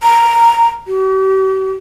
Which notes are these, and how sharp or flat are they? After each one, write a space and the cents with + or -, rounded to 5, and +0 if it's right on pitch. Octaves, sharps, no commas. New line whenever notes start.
A#5 -5
G4 -45